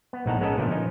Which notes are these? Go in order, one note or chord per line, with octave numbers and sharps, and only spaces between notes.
B3
A#1 A2 D#4 F#5 A5 A#5
G#3 B3 C#4 A4 A#4 D#5
A#2 D3 F3 A3
F3 C#4 D#4